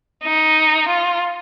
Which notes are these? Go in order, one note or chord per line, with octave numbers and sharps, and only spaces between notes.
D#4
F4